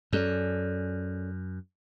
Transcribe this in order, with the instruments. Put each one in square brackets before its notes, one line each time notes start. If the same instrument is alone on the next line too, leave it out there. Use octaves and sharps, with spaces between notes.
[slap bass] F#2 [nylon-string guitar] C#4 A4 D5